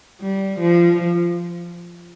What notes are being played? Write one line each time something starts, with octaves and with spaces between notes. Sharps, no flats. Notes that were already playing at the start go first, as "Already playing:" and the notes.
G3
F3